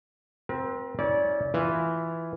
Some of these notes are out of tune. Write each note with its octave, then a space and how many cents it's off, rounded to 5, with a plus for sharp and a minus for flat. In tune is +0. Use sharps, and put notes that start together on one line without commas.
C4 +0 A#4 +45
C#4 -5 E4 -45 D5 -15
E3 +0 F4 +0